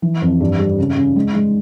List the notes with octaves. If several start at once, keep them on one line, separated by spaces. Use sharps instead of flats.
E3
F2
G2
G3
C#3
C#3
G#3
G#3